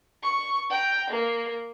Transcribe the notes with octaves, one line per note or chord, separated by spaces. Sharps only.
C#6
G5 A#5
A#3